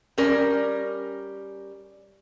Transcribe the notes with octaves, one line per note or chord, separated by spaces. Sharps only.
G3 C#4 A#4